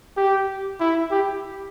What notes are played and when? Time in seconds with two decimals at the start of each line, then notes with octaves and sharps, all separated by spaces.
0.17 G4
0.80 E4
1.11 G4